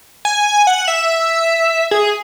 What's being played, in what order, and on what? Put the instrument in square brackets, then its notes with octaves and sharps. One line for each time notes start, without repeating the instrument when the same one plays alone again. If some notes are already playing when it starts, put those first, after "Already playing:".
[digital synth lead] G#5
F#5
E5
G#4